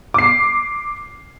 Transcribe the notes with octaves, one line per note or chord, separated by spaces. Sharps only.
D6 C7